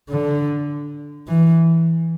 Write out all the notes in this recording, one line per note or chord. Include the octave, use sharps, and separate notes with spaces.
D3
E3